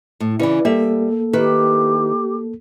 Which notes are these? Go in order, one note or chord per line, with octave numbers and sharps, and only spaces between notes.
A2
C#3 E3 E4 B4 D5
G3 A#3 A4 E5
D#3 E4 G4 B4